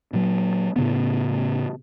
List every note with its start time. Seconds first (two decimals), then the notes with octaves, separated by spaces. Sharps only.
0.13 A#2 F#3
0.76 A2 C#3 B3